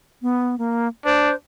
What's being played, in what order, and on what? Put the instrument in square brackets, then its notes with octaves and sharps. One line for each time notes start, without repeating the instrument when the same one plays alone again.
[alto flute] B3
A#3
[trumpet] D4 [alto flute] C5